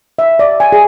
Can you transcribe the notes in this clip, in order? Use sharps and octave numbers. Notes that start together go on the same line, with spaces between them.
E5
D5
G#5
G#4